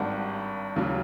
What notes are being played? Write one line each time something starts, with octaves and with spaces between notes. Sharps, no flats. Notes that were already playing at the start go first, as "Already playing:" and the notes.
Already playing: G#1 G2 D#3 F#5
D#2 C#3 F#3